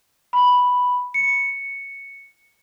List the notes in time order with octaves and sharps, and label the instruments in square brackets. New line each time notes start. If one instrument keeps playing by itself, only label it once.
[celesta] B5
C#7